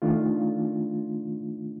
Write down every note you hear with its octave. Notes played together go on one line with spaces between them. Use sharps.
D#3 A3 D4 F4